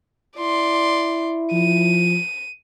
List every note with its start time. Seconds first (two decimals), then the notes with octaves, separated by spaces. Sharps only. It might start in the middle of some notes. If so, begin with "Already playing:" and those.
0.38 E4 D5 C6
1.52 F3 D#7